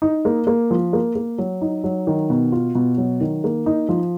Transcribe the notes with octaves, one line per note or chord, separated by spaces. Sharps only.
D#4
A#3
A#3
F3
A#3
A#3
F#3
D#4
F#3
D#3
B2
F4
B2
F#3
D#3
A#3
D#4
F3